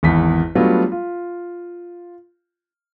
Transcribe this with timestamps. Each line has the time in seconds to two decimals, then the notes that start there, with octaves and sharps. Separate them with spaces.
0.03 G#1 E2 E4 B6
0.55 F#3 G3 A3 B3 D4 F4
0.92 F4